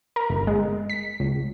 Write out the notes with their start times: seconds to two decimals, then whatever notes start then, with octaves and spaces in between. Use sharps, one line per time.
0.16 A#4
0.30 G1
0.47 G#3
0.89 B6
1.20 C#2